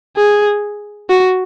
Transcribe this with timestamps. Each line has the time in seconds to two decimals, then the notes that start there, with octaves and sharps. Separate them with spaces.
0.17 G#4
1.09 F#4